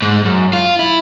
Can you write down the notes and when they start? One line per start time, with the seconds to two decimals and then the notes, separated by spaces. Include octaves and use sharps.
0.02 G#2
0.25 F#2
0.53 F4
0.79 E4